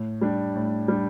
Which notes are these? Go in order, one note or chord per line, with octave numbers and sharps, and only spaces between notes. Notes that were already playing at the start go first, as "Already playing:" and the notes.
Already playing: A2
G3 D4
A2
G3 D4